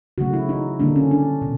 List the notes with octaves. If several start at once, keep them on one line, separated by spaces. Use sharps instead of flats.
C#3 F#3 A3 F#4
E4
D#4
D3 G3 A#3 D4
C#4
D4
B2